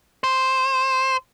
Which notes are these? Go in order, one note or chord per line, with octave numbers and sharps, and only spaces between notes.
C5